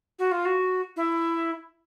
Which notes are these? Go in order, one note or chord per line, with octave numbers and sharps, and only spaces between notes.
F#4
F4
F#4
E4